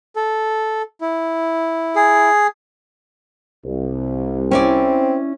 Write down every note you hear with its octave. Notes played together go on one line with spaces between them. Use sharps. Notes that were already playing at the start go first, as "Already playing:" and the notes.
A4
E4
G#4
C2
C4 C#4 E4 D5